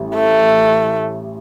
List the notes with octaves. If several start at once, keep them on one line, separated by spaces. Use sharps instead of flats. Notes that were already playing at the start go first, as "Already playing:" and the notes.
Already playing: A1 A2 G3
A3